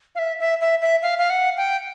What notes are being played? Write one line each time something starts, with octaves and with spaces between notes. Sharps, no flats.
F5
E5
E5
E5
E5
F5
F5
F#5
G5